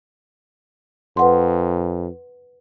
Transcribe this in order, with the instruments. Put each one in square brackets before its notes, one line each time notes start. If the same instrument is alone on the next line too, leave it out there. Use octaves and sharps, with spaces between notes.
[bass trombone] F2 [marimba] B4 F#5 C6